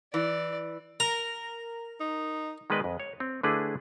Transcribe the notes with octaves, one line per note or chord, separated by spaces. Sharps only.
E3 D5
A#4 A#5
D#4
D#3 G#3 B3 B4 D5 D#5
F2
C#5
C4
D3 A3 D4 E4 G#4 B4